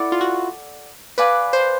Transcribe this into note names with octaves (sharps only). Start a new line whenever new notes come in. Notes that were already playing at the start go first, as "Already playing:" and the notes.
Already playing: E4 A4 D5 F#5
F4
F#4
B4 D5 F5 G#5
C5